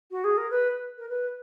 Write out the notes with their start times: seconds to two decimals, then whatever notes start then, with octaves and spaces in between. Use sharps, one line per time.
0.11 F#4
0.24 G#4
0.37 A#4
0.50 B4
0.98 A#4
1.09 B4